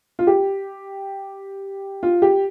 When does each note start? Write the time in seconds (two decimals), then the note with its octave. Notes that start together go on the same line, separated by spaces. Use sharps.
0.19 F4
0.27 G4
2.03 F4
2.22 G4